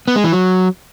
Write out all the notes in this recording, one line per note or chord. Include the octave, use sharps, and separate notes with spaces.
B3
G#3
E3
F#3